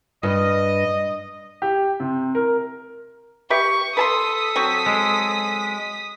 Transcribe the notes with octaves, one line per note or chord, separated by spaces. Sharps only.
G2 D#5
G4
C3
A#4
G4 B4 E5 C#6
A4 B4 A5 C6 D#6 B6
F#3 C4 C#6
G#3